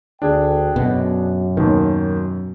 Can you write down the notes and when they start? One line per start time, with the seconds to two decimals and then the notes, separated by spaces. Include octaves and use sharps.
0.22 D2 D4 G#4 G5
0.76 F#2 B2
1.57 D#2 B2 D#3